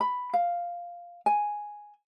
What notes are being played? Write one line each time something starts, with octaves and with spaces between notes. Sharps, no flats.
B5
F5
G#5